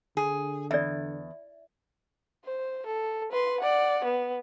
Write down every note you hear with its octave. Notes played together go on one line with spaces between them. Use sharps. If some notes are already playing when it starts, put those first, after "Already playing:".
D3 G#4
E2 D5 E5
C5
A4
B4 C6
D5 F#5
B3